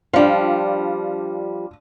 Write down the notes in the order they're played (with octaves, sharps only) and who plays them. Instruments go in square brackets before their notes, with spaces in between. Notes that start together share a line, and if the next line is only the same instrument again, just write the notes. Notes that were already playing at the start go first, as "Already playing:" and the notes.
[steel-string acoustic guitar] F3 G3 [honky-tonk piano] D4 F4